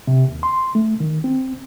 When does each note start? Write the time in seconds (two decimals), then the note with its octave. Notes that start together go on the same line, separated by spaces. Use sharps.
0.07 C3
0.28 D#2
0.43 C6
0.75 A3
1.00 D#3
1.24 C4